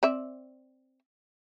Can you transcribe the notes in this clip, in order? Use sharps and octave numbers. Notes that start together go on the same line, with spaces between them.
C4 D5 E5